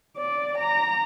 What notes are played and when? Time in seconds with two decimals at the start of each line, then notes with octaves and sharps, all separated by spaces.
0.17 D5
0.58 A#5